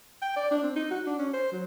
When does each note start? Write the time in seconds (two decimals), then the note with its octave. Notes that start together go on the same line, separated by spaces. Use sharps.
0.22 G5
0.36 D5
0.51 D4
0.63 C4
0.76 D#4
0.91 F#4
1.06 D4
1.19 C#4
1.33 C5
1.52 F#3